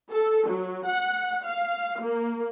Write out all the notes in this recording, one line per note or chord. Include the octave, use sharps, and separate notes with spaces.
A4
F#3
F#5
F5
A#3